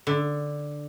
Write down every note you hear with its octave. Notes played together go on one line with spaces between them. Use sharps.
D3